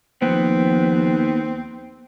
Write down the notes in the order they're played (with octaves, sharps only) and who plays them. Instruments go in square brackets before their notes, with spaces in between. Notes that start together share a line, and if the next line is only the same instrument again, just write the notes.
[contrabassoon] D#2 [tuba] F3 [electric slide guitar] B3 [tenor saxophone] C4